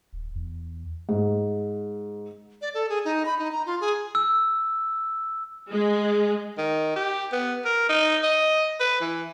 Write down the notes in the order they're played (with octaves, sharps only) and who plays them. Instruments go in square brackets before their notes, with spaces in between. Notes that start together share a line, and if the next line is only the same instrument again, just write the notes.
[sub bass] D#1
E2
[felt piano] G#2
[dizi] D5
A4
G#4
D#4
B5
D#4
A#5
F4
G#4
[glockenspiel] E6
[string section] G#3
[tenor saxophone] D#3
G4
B3
A#4
D#4
D#5
B4
E3